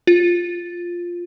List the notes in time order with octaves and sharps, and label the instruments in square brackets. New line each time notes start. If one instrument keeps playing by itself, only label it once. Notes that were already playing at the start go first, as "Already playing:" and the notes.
[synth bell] F4